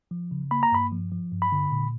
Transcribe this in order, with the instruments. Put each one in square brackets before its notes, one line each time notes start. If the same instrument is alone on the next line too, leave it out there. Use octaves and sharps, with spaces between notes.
[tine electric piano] F3
C#3
A#3 B5
A#5
G2 B5
F3
F3
G2
B5
D3
A#2